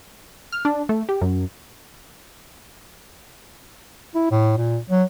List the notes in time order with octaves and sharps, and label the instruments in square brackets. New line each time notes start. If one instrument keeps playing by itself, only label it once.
[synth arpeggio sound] F6
D4
A3
G4
F#2
[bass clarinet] E4
A2
A#2
F#3